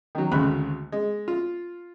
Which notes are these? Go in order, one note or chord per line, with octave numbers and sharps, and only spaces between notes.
D#3 F#3
G#1 D2 C#3 B5 F#6
G#3
F4